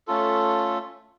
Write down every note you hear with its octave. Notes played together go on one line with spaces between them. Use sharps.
A3 C#4 F4 A4